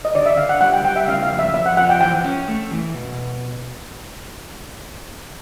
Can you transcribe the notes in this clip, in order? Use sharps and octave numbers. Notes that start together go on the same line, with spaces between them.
D#5
D3 D5
E5
D3 F5
F#5
G3 F#5
G5
G3 G5
E5
C#3 F5
F5
F2
E5
F2 E5
F#5
F3 F#5
G5
E3 G5
C#4
A3
E3
B2